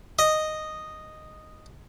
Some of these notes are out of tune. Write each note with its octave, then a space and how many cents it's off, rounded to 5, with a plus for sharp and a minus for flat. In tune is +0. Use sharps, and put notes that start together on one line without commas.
D#5 -5